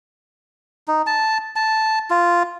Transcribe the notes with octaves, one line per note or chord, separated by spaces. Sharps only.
D#4
A5
A5
F4